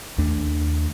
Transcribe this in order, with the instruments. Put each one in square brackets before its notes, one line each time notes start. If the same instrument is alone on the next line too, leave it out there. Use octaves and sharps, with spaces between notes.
[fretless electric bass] D#2 A3 D4